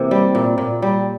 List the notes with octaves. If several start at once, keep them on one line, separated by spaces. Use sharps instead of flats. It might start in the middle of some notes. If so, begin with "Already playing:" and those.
Already playing: C3 E3 A#3
G3
A#2
A#2
G3